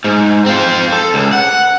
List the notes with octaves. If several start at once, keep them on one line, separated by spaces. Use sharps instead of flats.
G#2
C4 F4
A4
C#2
F#5